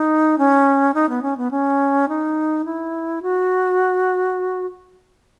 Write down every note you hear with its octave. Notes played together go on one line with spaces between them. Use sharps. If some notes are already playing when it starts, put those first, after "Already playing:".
Already playing: D#4
C#4
D#4
B3
C#4
B3
C#4
D#4
E4
F#4